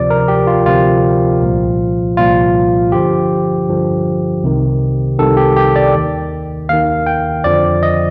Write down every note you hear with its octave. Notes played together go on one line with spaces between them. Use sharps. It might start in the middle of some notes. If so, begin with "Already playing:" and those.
Already playing: D2 C3 F3 D5
A#4
G4
F4
D2 C3 F3 F4
C2 A#2 F3
C2 A#2 F3 F4
G2 D3 F3 G4
G2 D3 F3
C2 C3 D#3
C2 C3 D#3 A4
G4
G4
D5
D#2 D#3
D#2 D#3 F5
G5
F2 D3 F3 D5
D#5